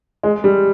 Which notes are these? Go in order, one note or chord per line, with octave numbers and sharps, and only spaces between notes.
G#3
G3